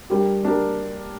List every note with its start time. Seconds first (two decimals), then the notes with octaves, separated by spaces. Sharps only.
0.10 G3 D4 G4 A#4
0.43 G3 D4 G4 A#4